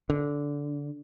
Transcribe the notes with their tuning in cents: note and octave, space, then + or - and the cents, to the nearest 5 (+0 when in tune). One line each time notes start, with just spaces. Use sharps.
D3 -15